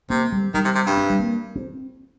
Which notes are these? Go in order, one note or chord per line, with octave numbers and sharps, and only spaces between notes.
C3 A#3
G3
D#3 G3
C3
C3
G2
C4
G3
A#3
C4